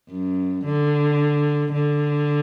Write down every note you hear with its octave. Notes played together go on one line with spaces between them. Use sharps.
F#2
D3
D3